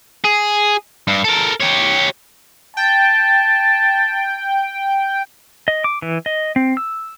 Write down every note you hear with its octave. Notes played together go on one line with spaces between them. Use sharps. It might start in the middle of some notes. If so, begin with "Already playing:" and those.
G#4
G2
A4 A#4
G4 C#5
G5 A5
D#5
D6
E3
D#5
C4
E6